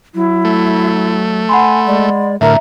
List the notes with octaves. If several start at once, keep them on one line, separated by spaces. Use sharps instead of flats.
F#3 E4
A3
F#5 G#5 B5 C6
G#3 D5
A2 D3 A#4 E5 A#5